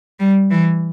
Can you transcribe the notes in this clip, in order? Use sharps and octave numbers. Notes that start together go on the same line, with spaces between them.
G3
E3